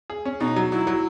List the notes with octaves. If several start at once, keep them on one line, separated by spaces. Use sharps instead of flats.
G#4
C#4
B2 D#4
F#3
F#3 E4
F#3